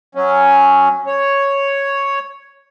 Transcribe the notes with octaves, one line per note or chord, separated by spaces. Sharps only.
F#3 C#4
C#5